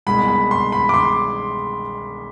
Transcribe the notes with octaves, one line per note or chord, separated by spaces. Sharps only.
C2 B2 G#3 B5
B5
C6
B5
D6
C6